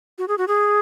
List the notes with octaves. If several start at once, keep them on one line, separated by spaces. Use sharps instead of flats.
F#4
G#4
F#4
G#4